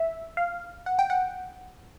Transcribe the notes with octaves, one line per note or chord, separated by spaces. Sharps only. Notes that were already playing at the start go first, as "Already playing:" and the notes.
Already playing: E5
F5
F#5
G5
F#5